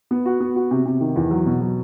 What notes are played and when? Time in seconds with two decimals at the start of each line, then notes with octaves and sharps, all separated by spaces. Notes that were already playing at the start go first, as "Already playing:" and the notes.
0.11 B3
0.26 F#4
0.40 B3
0.56 F#4
0.71 C3
0.86 C3
1.01 D#3
1.16 E2
1.31 F#3
1.46 B2
1.61 F#3